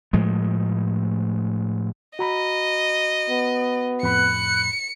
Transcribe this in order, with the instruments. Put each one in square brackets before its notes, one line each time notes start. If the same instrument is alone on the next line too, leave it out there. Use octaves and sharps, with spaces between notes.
[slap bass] A2 F3 G#3 A3
[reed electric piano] F#4 A#5 B5 [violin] D#5
[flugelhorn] B3
[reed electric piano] F2 A2 B5 [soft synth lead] F#6 [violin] C#7